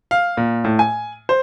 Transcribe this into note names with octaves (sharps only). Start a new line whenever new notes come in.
F5
A#2
A2
G#5
C5